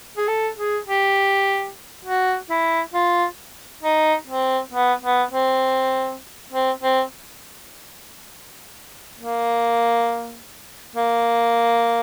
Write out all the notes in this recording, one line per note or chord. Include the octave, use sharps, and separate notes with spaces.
G#4
A4
G#4
G4
F#4
E4
F4
D#4
C4
B3
B3
C4
C4
C4
A#3
A#3